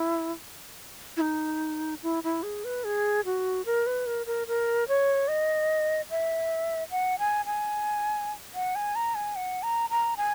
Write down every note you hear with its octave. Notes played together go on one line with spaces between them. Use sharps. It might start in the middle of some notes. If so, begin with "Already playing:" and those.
Already playing: E4
E4
D#4
E4
E4
G#4
B4
G#4
F#4
A#4
B4
A#4
A#4
A#4
C#5
D#5
E5
F#5
G#5
G#5
F#5
G#5
A#5
G#5
F#5
A#5
A#5
G#5